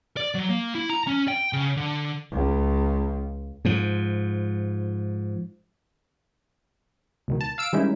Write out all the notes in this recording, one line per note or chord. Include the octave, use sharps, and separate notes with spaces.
D5
F#3
A#3
E4
A#5
C#4
G5
C#3
D3
C#2
G#2 F3
C#2 B2 D#3
A5
F5 E6 D7
D#3 G3 G#3 C#4 D#4 E4